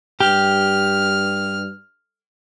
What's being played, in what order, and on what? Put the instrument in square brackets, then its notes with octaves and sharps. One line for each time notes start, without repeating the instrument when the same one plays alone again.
[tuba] G2 [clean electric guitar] G4 [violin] F6